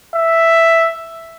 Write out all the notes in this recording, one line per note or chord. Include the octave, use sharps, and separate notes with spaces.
E5